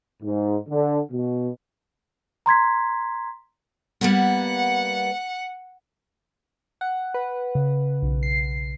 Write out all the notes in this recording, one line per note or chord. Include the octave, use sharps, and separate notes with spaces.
G#2
D3
B2
A#5 C6 G#6 B6
G3 A#3 B3 F#5
F#5
B4
C#3
B1
C7